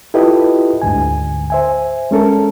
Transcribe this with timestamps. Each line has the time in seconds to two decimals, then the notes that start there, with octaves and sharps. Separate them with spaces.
0.14 E4 F4 G4 A4 B4 D#5
0.82 D2 G#2 D3 G#5
1.50 C5 E5 G#5
2.11 G#3 C#4 A4 A#4